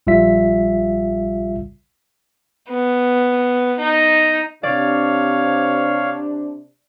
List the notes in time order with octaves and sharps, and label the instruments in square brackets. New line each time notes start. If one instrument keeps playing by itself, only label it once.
[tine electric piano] A#1 G3 F4 E5 B6
[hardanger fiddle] B3
D#4
[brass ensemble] C3 D4 [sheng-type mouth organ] C#5 F5 [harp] D5